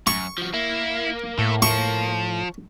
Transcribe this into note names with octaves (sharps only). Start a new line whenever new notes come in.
F#2 C#6
F3 F#4
A#3 E4
A2 A3
F3 C#6